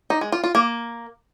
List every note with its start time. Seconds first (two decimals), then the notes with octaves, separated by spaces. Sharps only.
0.10 D#4
0.21 G#3
0.32 F4
0.44 F4
0.55 A#3